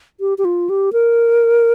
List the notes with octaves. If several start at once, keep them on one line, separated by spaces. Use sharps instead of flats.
G4
G4
F4
G4
A#4